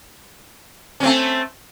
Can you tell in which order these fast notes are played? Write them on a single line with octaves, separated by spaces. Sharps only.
C#4 C4 A3